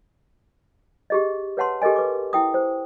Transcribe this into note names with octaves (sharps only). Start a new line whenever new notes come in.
G4 G#4 D#5
B4 C#5 F#5 A5 C6
G4 A4 A#4 D#5 G#5
B4 D6
E4 G5 D#6
C5